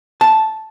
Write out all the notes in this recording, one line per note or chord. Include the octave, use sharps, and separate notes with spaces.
A5